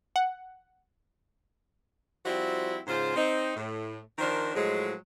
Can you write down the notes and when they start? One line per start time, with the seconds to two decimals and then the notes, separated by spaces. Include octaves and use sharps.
0.16 F#5
2.25 F3 G3 C4 E4 F#4
2.87 G#2 C#3 F4 C5
3.16 C4 D#4
3.56 A2
4.18 D#3 F3 D4 A#4 C5
4.55 A2 F3 F#3 G#3